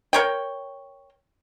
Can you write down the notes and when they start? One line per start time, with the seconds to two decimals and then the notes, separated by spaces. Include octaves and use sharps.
0.13 A#4 C#5 G5